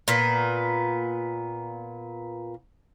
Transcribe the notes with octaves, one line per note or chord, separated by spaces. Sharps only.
A#2 B3